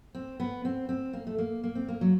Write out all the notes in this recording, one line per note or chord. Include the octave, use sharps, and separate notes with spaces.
C4
B3
C4
C4
A#3
A3
A#3
A#3
C4
A#3
F#3